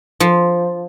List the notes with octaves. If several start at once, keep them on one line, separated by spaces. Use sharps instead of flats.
F3